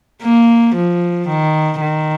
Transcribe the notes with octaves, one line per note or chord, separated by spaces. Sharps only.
A#3
F3
D#3
D#3